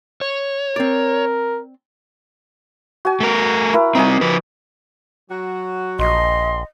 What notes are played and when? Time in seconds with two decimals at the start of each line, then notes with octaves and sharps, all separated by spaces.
0.21 C#5
0.76 C4 A#4 D5
3.05 F#4 G#5
3.20 A3 A#4
3.74 E4 A#4
3.95 G3 C4 D#4 D#5 G#5
4.21 F3 B4
5.30 F#3 F#4
5.99 A#1 D#5 C6